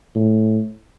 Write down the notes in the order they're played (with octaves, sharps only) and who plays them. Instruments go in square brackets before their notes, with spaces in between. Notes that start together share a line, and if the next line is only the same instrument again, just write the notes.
[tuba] A2